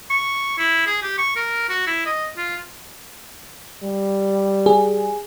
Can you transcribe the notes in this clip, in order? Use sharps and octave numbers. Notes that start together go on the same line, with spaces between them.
C#6
E4
G#4
G4
C#6
A#4
F#4
E4
D#5
F4
G3
G#4